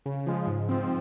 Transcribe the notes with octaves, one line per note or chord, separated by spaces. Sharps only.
C#3
F3 G#3
G#2
F3 C4